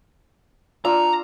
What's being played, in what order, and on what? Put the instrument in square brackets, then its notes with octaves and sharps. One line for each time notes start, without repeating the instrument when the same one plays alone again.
[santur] D4 F4 E6 [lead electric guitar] A#5